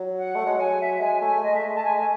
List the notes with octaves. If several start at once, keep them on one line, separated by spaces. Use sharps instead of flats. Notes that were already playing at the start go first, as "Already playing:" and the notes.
Already playing: F#3
F#5
A3
G#3
F#3 G#5
E5
G#3 G#5
A3 G#5
G#3 D#5
A3 E5
G#3
A3 A5
G#3 G#5
A3 G#5